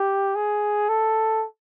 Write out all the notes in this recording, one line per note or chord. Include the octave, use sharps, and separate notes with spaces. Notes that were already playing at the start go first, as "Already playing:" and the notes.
Already playing: G4
G#4
A4